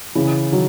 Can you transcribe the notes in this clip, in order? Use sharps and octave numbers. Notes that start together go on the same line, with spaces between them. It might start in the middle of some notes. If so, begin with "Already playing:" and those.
C#3 E3
D#3 F#3